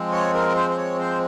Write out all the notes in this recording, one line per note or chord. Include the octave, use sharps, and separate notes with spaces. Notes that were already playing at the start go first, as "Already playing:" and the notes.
Already playing: F3 G#3 C4
C#5
A#4
C5
C5
C#5
C5